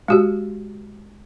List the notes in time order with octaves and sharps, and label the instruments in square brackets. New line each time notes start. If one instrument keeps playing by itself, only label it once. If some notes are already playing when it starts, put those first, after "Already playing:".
[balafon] G#3 F#4 G4